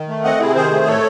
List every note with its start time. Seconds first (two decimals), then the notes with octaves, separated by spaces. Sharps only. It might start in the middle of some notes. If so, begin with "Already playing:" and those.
Already playing: D#3
0.08 A3
0.24 C4 D#5 F#5
0.40 C3 E4 G#4
0.55 D#3 G#4 C5
0.71 A3
0.87 A2 A4 C#5